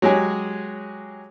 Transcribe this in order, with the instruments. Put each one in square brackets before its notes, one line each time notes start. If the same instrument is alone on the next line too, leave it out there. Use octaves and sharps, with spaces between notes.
[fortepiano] F#3 G#3 G4 G#4